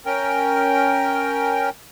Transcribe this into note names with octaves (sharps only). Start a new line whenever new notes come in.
C#4 A#4 G5